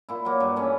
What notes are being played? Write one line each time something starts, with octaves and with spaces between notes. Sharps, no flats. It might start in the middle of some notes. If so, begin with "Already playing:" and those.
A#2 E4
F#3 A#3
G2
E3 A3 C#4